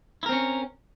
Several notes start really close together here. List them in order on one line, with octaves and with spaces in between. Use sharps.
E4 A#4 C4 C#4